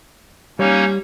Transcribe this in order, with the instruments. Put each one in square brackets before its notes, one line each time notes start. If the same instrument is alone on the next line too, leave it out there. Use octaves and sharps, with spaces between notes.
[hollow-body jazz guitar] G3 C#5 [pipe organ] A#3 C#4 D#4